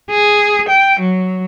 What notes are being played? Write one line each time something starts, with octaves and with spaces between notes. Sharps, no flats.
G#4
G5
F#3